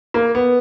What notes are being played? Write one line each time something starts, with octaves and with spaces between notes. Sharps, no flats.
A#3
B3